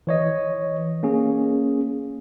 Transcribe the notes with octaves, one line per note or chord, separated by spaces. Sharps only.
E3 C#5 D#5
A#3 C#4 G#4